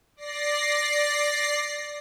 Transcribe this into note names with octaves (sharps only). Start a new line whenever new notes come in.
D5 A#6 C7